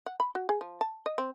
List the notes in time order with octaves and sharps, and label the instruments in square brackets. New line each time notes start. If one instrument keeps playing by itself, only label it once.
[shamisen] F#5
B5
F#4
G#4
F3
A5
D#5
C4